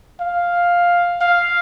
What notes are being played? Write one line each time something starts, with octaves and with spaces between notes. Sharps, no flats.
F5
F5